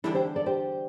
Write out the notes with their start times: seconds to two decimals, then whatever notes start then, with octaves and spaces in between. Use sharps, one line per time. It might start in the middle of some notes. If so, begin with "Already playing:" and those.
0.04 E2 D3 G3 D4 E4 A4
0.14 G4 C5
0.36 A4 D5
0.46 G4 C5